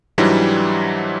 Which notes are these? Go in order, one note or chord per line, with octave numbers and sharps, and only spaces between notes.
G#2 E3 F#3 G3 D4 E4